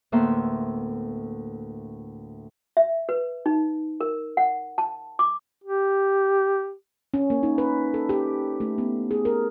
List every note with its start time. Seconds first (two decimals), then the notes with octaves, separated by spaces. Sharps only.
0.12 D2 A2 A#3 B3 E5 C6
2.77 E5
3.09 B4
3.46 D#4
4.01 A#4
4.37 F#5
4.78 A5
5.19 D6
5.64 G4
7.14 C#4
7.30 A#3
7.43 D#4
7.58 B4
7.94 A4
8.09 G4
8.60 A3
8.78 B3
9.11 G#4
9.25 A#4